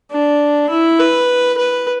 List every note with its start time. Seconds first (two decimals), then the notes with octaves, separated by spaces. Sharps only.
0.11 D4
0.69 E4
0.99 B4
1.58 B4